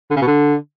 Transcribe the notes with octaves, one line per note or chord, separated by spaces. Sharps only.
D3
C#3
B2
D3